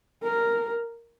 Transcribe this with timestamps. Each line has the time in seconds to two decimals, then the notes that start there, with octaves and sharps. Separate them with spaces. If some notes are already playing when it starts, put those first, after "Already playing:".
0.23 A#4